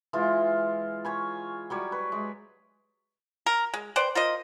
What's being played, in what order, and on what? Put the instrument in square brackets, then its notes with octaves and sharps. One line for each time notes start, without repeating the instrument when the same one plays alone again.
[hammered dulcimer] E3 G#3 F4
C#5 G#5 B5
F#3 G3 C#5
B4
G#3
[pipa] A#4
G#3
B4 C5 D5 G5
F4 A#4 C5 D#5